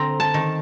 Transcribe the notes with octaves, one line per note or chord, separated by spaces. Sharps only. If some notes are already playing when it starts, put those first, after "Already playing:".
Already playing: D3 C4 A#5
A5
D#3